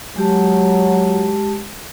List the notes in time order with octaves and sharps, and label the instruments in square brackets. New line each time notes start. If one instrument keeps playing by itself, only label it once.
[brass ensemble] F#3 [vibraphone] G#3 G4 A5